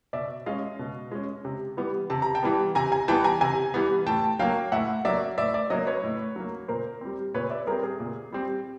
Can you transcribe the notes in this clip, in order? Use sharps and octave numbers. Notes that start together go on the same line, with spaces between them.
B2 D5 E5
G#3 C#4 D#5 F5
B2
G#3 C#4
C3
E3 G3 B3
C3 A5
A#5
G5 A5
E3 G3 B3
C3 G#5 A#5
G#5 A#5
E3 G3 B3 G5 A5
G#5 A#5
C3 G#5 A#5
E3 G3 B3
A2 G5 A5
F#3 A#3 F5 G5
A2 E5 F#5
F#3 A#3 D5 E5
A2 D5 E5
D5 E5
F#3 A#3 C#5 D#5
B4 C#5
A2
F#3 A#3
A#2 A#4 C5
G3 C4
A#2 B4 C#5
D5 E5
G3 C4 G#4 A#4
G#4
A#2
G3 C4